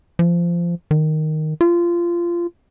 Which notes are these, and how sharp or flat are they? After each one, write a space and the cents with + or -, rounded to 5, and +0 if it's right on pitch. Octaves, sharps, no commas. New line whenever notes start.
F3 -20
D#3 -5
F4 -20